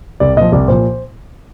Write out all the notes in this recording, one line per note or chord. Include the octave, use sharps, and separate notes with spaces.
C2 D5
A#2 F3 D#5
C2 D5
A#2 F3 C5